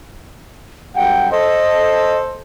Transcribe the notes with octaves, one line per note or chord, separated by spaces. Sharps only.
F#2 G3 F#5 G5
A4 C5 D#5